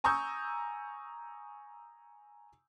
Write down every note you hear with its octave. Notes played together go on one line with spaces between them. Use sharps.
G#5 A#5 C#6 D#6 E6 G6